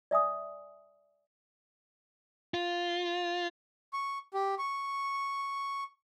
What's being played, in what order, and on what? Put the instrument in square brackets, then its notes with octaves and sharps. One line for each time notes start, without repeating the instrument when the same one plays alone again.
[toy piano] D5 E5 G#5 D#6
[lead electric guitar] F4
[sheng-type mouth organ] C#6
G4
C#6